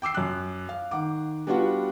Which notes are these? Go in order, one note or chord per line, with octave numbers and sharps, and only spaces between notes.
G5 D6 E6 C7
F#2 F#6
F5
D#3 F#5 D6
G3 B3 D4 F4 F#4 F#5